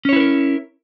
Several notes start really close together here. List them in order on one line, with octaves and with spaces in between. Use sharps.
C#4 C#5 E4 B4 A#4